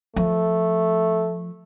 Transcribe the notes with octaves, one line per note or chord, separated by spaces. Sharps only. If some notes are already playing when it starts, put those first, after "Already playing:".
F3 A3